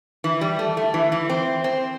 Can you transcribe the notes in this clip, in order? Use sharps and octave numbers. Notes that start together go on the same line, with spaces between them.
E3
G3
A3
A3
E3
E3
C4
C4